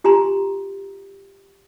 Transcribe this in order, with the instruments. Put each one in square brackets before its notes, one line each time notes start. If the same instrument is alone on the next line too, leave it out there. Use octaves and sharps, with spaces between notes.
[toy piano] F4 G4 G#5 A#5 C6